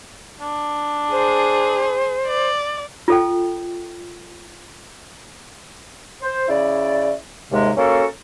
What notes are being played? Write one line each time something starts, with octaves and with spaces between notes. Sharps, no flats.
D4
G#4 C5
D5
F4 A4 G5
C5
C#3 E4 D5
D#2 G#2 C3 G#3
A#3 C#4 F#4 A4